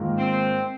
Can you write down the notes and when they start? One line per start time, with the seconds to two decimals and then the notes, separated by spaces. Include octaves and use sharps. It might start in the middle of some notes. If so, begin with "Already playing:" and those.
Already playing: G#2 D#3 A#3 F4
0.18 C4